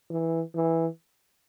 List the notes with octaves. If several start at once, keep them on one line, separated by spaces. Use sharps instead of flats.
E3
E3